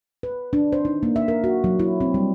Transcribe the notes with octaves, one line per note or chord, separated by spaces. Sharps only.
B4
D4
C5
D#4
A#3
E5
A#4
F#4
F#3
E4
C4
G3